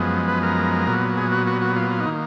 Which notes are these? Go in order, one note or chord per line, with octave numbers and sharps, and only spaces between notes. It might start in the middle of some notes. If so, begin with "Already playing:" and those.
Already playing: F#2 F3 G#3 B3
B4
A#4
A#2 F#3 B3
G#4
F#4
F#4
F#4
F4
F4
D#4
D#3 A#3